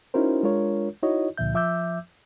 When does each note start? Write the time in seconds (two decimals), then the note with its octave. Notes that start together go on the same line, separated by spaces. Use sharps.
0.14 C#4 D#4 E4 F#4 A#4 C5
0.43 G#3 D4 F4 A#4 C#5
1.03 D#4 E4 F#4 C#5 D#5
1.38 C#2 A#2 D3 F3 E5 G6
1.54 F3 E5 D6 E6 G6